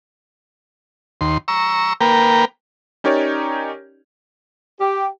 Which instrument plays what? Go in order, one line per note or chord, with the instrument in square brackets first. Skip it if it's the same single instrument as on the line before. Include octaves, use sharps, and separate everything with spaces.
[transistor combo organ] D#2 C6
A#5 C#6 E6
A#3 A#4 B4 G5
[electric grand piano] C#4 D#4 G4 A#4 C#5 D5
[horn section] G4